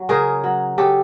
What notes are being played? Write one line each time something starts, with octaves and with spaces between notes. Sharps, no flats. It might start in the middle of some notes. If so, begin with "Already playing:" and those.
Already playing: F#3
C#3 G#4 A#4
F#3
C#3 G4 A4